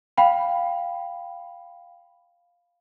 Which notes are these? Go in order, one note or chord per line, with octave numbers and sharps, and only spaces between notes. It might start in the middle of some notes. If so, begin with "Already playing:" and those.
F5 G5 B5